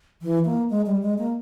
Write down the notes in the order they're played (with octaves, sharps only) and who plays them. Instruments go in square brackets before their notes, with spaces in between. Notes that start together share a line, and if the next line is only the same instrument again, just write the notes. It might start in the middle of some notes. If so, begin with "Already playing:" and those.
[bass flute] E3
A#3
G#3
G3
G#3
A#3